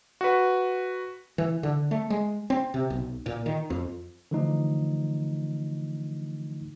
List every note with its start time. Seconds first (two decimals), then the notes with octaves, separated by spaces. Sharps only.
0.21 F#4 B4
1.38 E3
1.63 D3
1.91 A3
2.10 G#3
2.50 C4
2.74 C3
2.90 B1
3.26 A#2
3.46 D#3
3.70 F2
4.31 D3 E3 F3 A3 D#4